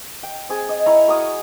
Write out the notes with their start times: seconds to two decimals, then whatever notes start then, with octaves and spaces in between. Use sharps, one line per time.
0.23 G5
0.49 C4 G#4
0.69 D#5
0.86 E4 C#5 A#5
1.08 F#4 A#4 C#6 D#6